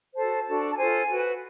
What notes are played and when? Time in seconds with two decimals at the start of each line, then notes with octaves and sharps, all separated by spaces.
0.15 F#4 A4 C5 A5
0.46 D4 F#4 A4
0.71 A5
0.77 F4 A4 C5 G#5
1.08 F#4 B4